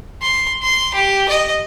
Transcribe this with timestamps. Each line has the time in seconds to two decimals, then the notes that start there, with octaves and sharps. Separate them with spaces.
0.21 C6
0.62 C6
0.94 G4
1.29 D#5